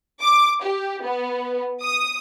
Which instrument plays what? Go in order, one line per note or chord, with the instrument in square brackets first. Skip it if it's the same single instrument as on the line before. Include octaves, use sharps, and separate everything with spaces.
[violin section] D6
G4
B3
D#6